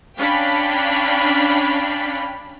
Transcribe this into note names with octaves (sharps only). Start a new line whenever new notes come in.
C#4 D4 F5 G5 B5 B6